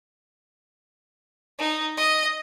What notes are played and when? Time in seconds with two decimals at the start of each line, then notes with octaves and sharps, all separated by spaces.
1.59 D#4
1.97 D#5